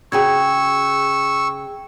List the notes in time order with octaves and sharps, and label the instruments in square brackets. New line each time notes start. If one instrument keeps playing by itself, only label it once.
[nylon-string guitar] C#3 F#4 G#4 [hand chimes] G5 G#6 [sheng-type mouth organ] C#6 E6